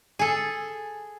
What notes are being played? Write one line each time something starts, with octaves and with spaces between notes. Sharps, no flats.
G#4 A4